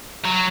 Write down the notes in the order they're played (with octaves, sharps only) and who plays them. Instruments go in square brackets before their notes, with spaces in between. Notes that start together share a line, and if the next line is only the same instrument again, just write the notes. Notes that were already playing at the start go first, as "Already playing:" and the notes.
[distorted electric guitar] F#3